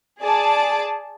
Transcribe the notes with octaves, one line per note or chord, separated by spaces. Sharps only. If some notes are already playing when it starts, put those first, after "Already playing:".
G#4 D5 A5